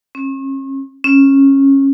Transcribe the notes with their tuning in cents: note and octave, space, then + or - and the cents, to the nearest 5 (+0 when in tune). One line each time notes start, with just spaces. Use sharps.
C#4 -40
C#4 -20